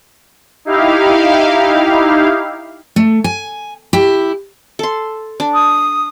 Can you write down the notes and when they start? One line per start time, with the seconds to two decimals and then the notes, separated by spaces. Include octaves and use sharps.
0.65 D#4 E4 G4 F5
2.96 A3
3.24 G#5
3.93 E4 G4
4.79 A4 C6
5.40 D4
5.54 D#6